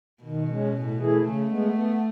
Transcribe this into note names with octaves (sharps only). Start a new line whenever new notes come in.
B2 D#3
G#3 C#4
A2
E3 A3 E4 G#4
C#3 A3
G#3 B3
B3